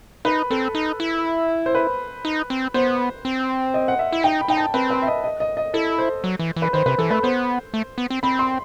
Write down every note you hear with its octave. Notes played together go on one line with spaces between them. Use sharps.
D#4 B4
C4 A4
D#4
E4
C5
B4
D#4
C4
B3 C5
C4
D#5
F#5
E5
E4
D#4 G5
B5
D#4 G5
A5
C4 B4
B4
E5
D#5
D#5
D#5
D#5
E4 A4
C5
F#3
E3
E3
B4
D#3 C5
C3 B4
E3 A4
A3 B4
B3 C5
A3
B3
C4
C4 B5
C6